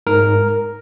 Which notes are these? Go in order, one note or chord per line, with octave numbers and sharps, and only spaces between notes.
G#2 A#4